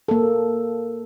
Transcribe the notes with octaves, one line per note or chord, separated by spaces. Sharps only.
A#3 A4